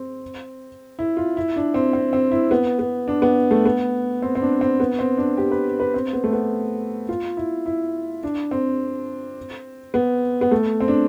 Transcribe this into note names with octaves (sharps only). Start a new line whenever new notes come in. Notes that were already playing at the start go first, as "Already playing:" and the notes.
Already playing: C4
E4
F4
E4
D4
C4
C4
C4
E4
B3
B3
D4
B3
A3
B3
C4
C4
D4
C4
B3
C4
D4
G4
B4
B4
C4
B3
A3
B3
F4
E4
E4
D4
C4
B3
B3
A3
C4
D4